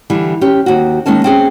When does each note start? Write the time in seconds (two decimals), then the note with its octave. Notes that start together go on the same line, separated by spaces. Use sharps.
0.10 D3 E3 G3
0.41 C#4 G4
0.66 D#2 F#4
1.06 D#3 G#3 A#3 C#4 A5
1.24 C4 C#4 G#4